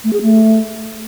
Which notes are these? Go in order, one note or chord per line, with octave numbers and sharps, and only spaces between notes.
A3
G#4
A3